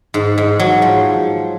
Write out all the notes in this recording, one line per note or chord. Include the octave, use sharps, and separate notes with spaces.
G#2
G#2
F#3
F3